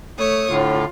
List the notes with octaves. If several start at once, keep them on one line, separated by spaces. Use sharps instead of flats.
A3 C#5 D#6
A2 D3 F4